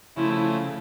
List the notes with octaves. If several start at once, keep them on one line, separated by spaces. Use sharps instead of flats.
C#3 F3 A3 E4